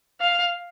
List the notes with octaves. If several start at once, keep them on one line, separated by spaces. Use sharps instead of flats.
F5